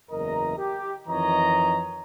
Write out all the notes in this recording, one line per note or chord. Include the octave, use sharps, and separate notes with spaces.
F#1 E2 A#4 D#5 A#5
G4
F2 D#3 E3 C#5 D#5 A#5